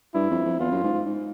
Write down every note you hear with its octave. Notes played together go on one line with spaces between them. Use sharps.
G2 E4
F2
F2
E2 F4
F#2
G#2
G#2
G#2